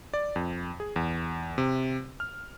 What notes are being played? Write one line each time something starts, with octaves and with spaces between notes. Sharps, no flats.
D5
F2
G#4
E2
C3
F6